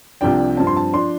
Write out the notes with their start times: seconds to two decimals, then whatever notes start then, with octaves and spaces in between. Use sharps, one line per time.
0.21 C2 C3 F3 D4 G5
0.57 G2 F3 C4 A5
0.67 C6
0.77 A5
0.93 F3 D4 C6